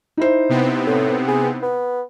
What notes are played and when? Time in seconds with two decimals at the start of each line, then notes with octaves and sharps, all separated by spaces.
0.17 D#4 E4 C5
0.49 C3 B3 C4
0.87 A2
1.28 G#4
1.62 B3